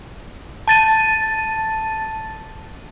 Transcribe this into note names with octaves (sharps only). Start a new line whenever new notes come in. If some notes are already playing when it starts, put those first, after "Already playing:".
A5 A6 D#7